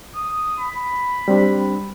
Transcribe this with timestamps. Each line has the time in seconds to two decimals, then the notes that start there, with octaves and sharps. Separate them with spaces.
0.16 D#6
0.59 B5
1.28 G3 C4 D4